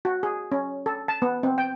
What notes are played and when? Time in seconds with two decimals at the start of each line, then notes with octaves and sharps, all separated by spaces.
0.05 F#4
0.23 G#4
0.52 C#4
0.86 A4
1.08 A5
1.22 B3
1.43 C4
1.58 G5